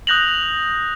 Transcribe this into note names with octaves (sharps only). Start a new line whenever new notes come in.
D#6 F#6 G6 A#6 F7 F#7